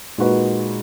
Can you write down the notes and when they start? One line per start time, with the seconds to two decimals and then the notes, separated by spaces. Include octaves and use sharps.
0.18 A#2 G#3 D#4 F#4 B4